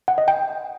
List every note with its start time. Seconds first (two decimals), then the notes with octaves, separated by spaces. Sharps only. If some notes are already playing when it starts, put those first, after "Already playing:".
0.08 F#5
0.18 D#5
0.28 G5